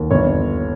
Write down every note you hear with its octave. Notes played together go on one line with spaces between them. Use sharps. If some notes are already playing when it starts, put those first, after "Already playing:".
Already playing: D#2
G1 C#5